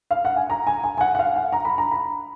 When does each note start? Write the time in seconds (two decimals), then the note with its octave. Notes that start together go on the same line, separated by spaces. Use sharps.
0.11 F5
0.25 F#5
0.36 G#5
0.50 A#5
0.67 G#5
0.84 G#5
0.97 G#5
1.01 F#5
1.15 F#5
1.19 F5
1.36 F#5
1.52 A#5
1.65 B5
1.78 A#5
1.92 B5